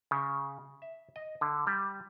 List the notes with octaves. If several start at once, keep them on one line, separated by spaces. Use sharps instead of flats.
C#3
E5
D#5
D3
G3